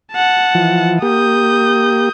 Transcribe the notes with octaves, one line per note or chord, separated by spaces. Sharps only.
F#5 A5
E3 F3
A#3 G4 D#6 G6